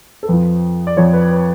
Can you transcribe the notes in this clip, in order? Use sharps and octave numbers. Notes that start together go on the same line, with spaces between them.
A4
F2 F3 B4
D5
F2 F3 C#5
B4
B4